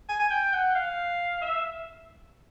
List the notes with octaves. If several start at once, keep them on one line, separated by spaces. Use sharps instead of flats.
G#5
G#5
G5
F#5
F5
E5